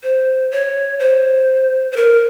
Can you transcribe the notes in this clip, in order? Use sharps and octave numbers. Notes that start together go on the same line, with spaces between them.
C5
C#5
C5
C5
A#4